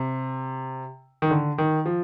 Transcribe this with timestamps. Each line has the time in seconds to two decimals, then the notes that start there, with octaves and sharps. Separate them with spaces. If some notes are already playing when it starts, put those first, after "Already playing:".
Already playing: C3
1.22 D#3
1.31 D3
1.58 D#3
1.86 F3